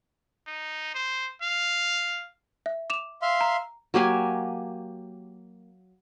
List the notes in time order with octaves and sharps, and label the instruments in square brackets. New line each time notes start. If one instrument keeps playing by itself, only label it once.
[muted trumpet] D#4
C5
F5
[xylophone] E5
D6 E7 F7
[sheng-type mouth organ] E5 F5 C6
[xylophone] A#5
[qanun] F#3 A#3 G4 G#5